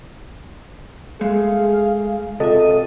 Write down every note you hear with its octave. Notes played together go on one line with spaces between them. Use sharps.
G#3 A3 G#4 F5
C3 F4 A4 D#5 E5